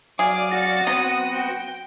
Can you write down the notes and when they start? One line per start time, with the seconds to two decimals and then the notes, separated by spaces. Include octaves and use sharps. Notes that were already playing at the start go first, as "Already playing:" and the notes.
0.19 F#3 G#4 D5 F5 D6
0.53 F#4 A6 C#7
0.87 F#3 B3 C4 D#6
1.34 G5